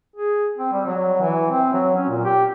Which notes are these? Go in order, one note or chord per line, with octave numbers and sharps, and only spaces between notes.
G#4
C4
G3
F#3
E3
C4
F#3
C#4
A#2
G4